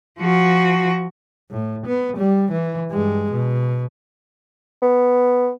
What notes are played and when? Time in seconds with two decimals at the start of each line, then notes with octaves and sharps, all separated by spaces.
0.19 F3 F#4
1.51 A2
1.87 B3
2.17 G3
2.52 E3
2.90 G2 G#3
3.31 B2
4.82 B3